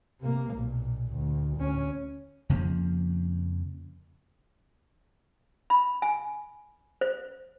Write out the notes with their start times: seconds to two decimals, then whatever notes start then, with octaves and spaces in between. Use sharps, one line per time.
0.21 C3 A#3
0.51 B1 A#2
1.12 D2
1.58 D2 C#4
2.49 F2 C#3 F3 A#3
5.70 B5
6.02 G#5
7.01 C5